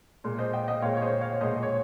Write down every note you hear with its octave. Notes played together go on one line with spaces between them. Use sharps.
A#2 G#3
C5 D#5
D#5 G5
D#5 G5
A#2 G#3 C#5 F5
C#5
C5 D#5
C#5 F5
A#2 G#3 C5 D#5
D#5
C#5